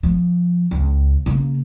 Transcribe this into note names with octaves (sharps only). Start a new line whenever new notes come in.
F3
C#2
C#3 A#3